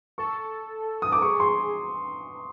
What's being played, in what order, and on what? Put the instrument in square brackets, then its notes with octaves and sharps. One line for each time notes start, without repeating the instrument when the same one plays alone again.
[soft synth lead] A4 [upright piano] C#6
[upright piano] D#6
D6
[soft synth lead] A4
[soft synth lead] G#4 [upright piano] C#6
[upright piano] C6